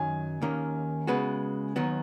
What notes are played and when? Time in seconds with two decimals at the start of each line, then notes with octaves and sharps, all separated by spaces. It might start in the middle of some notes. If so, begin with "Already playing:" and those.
Already playing: F#2 D#3 F#3 G#5
0.42 D#2 D#3 A#3 C#4
1.07 C#3 G#3 B3 F#4 B4
1.76 D#2 D#3 F#3 B3 F#4